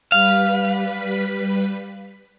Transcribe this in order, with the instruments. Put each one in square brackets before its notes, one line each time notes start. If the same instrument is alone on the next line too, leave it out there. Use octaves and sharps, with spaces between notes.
[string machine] G3 B4 B6 [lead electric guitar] F5